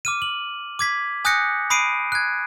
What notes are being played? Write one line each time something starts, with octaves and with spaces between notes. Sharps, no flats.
D6 F6 D#7
F#7
D6 G#6 B6
G#5 D#6 F#6 G6 A#6 C#7
B5 D#6 C7 D7 D#7
F#6 G#6